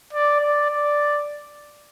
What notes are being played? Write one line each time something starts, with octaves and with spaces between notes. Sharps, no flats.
D5
D5
D5